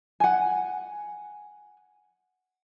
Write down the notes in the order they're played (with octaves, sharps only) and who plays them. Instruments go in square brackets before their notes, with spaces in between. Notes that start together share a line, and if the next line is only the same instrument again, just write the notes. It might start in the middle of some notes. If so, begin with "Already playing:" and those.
[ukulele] F#5 G#5